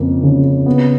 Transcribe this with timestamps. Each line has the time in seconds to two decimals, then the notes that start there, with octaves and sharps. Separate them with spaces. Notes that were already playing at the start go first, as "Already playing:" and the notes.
Already playing: F2 C#3 A#3
0.23 C#3
0.66 B3